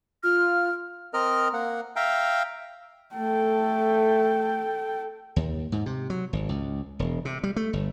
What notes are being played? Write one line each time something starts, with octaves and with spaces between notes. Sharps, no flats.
F4 F6
C4 A#4 D#5 F6
A#3 F#5
E5 F5 G5 A#5
A3 A4 G5
D#2
G#2
C3
F#3
G#1
C#2
E1
C3
G3
A3
G1